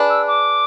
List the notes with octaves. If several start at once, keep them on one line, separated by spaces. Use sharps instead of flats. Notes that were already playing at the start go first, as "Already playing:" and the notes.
Already playing: D4 G#4 B4
E6
D6